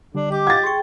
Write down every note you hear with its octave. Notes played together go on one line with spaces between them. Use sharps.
D3 G3 D4
G4 D#5 D6
F5 F#5 G#6 A6
G#4 G5 C6 C#6